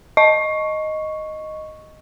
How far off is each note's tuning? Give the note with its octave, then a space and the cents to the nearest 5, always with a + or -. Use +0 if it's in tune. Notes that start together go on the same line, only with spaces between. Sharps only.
D#5 +0 C#6 +0